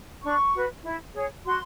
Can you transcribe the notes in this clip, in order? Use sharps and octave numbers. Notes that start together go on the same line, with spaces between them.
D4 C#6
F#4 B4
E4
G#4 C#5
F#4 C6